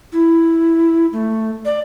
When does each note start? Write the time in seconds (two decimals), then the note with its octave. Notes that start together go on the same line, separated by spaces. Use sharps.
0.13 E4
1.13 A3
1.65 D5